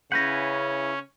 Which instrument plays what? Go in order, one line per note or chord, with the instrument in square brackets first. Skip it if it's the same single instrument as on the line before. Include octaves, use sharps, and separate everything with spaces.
[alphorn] C#3 [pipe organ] C#4 [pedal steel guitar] E4 B4 F#5 [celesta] G6 A#6